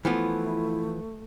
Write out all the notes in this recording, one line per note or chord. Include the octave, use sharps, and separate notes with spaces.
E3 F3 A3 B3 E4